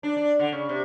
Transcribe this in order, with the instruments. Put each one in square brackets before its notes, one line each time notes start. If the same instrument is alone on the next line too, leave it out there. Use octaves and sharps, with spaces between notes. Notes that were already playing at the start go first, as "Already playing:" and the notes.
[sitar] D4
D4
D3
C#3
C3